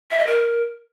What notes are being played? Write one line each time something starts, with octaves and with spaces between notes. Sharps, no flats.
E5
D#5
A#4